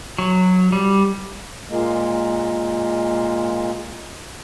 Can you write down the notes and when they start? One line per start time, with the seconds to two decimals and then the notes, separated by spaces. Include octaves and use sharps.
0.19 F#3
0.72 G3
1.69 A#2 G#3 A#3